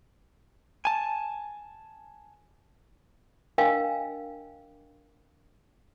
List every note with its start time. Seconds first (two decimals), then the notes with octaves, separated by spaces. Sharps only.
0.85 G#5 A5
3.58 D4 A#4 D#5 F5 G5 G#5